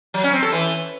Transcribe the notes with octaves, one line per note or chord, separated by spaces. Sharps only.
F#3
C#4
C4
A4
E3